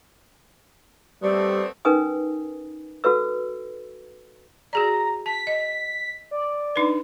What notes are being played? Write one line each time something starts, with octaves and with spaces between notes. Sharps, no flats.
G3 A3 B3 C4 D5
C#4 D#4 A#4 B4 G#5 D#6
F#4 A4 B4 E6
F#4 G#4 D5 A#5
A5 B6
D#5
D5
D4 D#4 B4